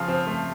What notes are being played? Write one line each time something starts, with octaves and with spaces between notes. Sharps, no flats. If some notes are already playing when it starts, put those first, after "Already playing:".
Already playing: C#3 F3 F5
C4
A3